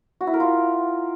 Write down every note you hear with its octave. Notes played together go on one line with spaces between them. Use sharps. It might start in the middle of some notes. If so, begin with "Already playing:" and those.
F#4
E4
A#4
F4